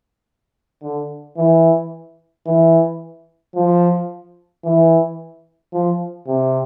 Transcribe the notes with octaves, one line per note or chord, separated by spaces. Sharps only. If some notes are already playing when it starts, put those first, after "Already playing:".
D3
E3
E3
F3
E3
F3
C3